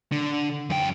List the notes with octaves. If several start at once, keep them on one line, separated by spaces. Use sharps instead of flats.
D3
F#2 G5